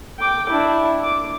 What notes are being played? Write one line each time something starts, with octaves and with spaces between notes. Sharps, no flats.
G5 D6
D4 E4
D6